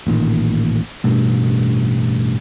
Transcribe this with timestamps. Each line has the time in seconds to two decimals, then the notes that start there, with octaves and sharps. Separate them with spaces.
0.07 A1 A#2 D#3
1.04 A1 G2 B2 A3